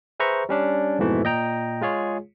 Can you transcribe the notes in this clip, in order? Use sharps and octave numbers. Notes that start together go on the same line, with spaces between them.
G#4 B4 C5 E5 A#5 C#6
G3 C#4 D4
F2 G#2 B2 E3 A3
A#2 D#5 G5 A#5
G#3 F4 G#4 C#5